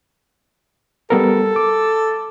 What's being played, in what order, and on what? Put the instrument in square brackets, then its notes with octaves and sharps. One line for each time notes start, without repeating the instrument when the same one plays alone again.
[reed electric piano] G3 B3 A#4 [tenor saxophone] A4
[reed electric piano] D6